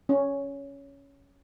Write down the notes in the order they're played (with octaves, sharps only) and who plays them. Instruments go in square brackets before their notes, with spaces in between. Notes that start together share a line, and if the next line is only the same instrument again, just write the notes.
[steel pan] C#4